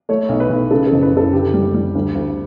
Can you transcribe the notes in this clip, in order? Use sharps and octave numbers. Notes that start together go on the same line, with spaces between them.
A3 C#5
B1
B4
B1
C#3 A4
A4
F#1
B4
F#1 A4
D3 G4
G3
G3
D2
D2